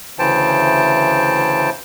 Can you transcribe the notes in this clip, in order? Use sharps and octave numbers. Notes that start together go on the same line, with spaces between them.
D2 C#3 E3 C5 G5 A5